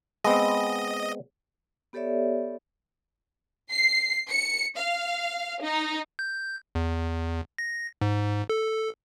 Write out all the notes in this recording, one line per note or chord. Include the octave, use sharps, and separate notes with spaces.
G#3 B3 C4 D#5
B3 G4 A4 C#5 D5 E5
C7
C#7
F5
D#4
G6
E2
A#6
G#2
A4